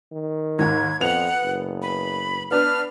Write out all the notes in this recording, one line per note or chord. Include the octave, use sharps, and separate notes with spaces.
D#3
D#2 G#2 G#6
F2 B3 F#5 F7
F#1
B5
B3 D4 B4 F6